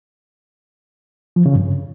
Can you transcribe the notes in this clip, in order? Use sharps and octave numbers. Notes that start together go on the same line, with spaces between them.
F3
C#3
G2